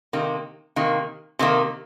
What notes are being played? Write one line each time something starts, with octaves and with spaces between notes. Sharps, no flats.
C3 D#3 A#3
C3 D#3 A#3
C3 D#3 A#3